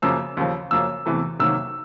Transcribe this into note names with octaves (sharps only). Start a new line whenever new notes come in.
F#2 C#3 F3 A#3 E6
D#2 C#3 F3
F#2 C#3 F3 A#3 E6
E2 C3 E3 A3
C2 C3 D#3 F#3 A#3 E6